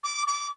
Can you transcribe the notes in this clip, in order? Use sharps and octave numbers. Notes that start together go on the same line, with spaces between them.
D6
D6